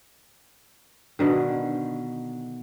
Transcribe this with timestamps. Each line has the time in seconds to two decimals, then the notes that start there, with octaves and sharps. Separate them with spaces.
1.19 B2 D3 D#3